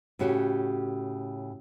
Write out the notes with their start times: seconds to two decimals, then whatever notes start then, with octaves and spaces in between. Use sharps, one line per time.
0.19 A2 C#3 F#4 G4 C#5